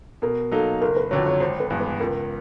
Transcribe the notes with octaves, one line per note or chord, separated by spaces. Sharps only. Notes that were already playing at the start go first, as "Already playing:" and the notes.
B2 A#4
F#3 A#3 D#4 A4
F#1 A#4
B4
F2 D3 F#3 C#5
C#5
G#1 C5
B4
G2 E3 G#3 B3
B4
C#2 A#4